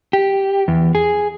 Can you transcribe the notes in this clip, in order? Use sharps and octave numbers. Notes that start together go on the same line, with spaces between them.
G4
E2
G#4